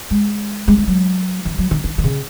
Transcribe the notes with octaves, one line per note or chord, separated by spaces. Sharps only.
G#3
G#3
G#3
F#3
E3
F#3
D#3
D#3
D#3
C#3